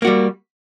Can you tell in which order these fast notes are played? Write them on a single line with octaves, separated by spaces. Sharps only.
A#3 F#4 G3